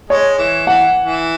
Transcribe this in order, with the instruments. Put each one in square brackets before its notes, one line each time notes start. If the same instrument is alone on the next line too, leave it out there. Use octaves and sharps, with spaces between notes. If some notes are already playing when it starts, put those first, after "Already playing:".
[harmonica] G#3 [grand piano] C#5
[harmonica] E3
[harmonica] E3 [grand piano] F#5
[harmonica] E3